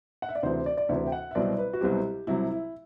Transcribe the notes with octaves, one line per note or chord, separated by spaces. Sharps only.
F#5
E5
D5
D2 C3 E3 C5
D5
D5
D2 C3 E3 E5
G5
F#5
E5
C2 B2 F#3 C4 D5
B4
F#4
C2 B2 F#3 C4 G4
C2 C3 F#3 E4
E4